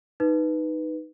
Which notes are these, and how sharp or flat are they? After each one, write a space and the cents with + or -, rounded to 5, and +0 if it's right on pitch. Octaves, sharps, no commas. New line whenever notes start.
D#4 +0 B4 +0